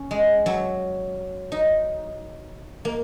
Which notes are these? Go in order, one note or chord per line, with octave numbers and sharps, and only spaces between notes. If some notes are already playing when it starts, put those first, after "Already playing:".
Already playing: C#4
G#3
F#3
D#4
A#3